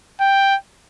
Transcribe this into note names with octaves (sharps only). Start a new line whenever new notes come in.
G5